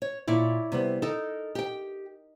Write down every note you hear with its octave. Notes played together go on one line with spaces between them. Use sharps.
C#5
A#2 E4 C#5 D5
C3 G3 B3
D#4 A4 A#4
G4 G5